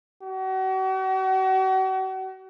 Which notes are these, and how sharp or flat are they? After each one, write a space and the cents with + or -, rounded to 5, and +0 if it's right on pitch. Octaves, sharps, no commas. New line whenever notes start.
F#4 +40